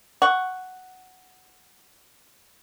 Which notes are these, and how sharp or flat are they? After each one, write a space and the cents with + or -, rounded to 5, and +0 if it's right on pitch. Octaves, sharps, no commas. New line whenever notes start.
F#5 +5 C#6 +0